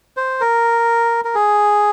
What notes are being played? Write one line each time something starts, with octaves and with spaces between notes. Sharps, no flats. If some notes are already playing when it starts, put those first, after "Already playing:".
C5
A#4
A#4
G#4